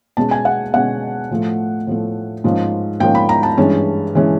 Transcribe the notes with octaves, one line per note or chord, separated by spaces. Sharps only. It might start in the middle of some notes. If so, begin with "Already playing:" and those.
B2 G#3 C#4 A5
G#5
F#5
B2 G#3 C#4 F#5
A2 F3 A3
A2 F3 A3
G#2 F3 A#3 C#4
G#2 F3 A#3 C#4 G5
B5
A#5
A5
G2 E3 G#3 C#4
E3 G#3 C#4